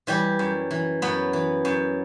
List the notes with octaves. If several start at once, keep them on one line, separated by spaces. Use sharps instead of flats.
E3 G3 G4
F#2
E3
F#2 B3 B4
E3
F#2